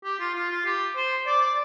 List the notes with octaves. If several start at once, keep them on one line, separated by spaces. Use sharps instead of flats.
G4
F4
F4
F4
G4
C5
D5
D5